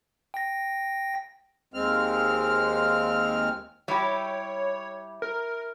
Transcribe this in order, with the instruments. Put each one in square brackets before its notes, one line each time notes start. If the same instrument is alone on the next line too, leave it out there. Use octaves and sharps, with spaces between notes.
[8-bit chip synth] G5 A#6
[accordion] D#2 G#3 C4 F6
[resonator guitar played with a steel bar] G3 G4 [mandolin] E4 [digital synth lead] C#5
[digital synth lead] A#4